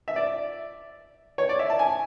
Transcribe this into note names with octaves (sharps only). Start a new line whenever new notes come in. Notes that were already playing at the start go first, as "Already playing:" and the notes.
E5
D5
C#5
D5
E5
A5
G#5